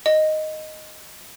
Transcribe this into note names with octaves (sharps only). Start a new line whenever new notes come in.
D#5